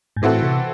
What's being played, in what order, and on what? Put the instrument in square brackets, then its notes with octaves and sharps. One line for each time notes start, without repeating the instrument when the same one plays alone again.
[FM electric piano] G#2
[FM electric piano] A2 [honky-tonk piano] E3 C4 F#4 A4
[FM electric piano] C3